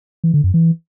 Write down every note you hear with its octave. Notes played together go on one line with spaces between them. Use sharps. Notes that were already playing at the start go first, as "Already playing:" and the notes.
E3
D3
F#2
E3